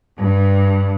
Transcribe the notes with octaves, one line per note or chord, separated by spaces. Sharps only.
G2